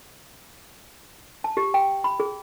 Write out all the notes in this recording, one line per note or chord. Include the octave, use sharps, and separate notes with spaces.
A5
G4
G5
B5
G#4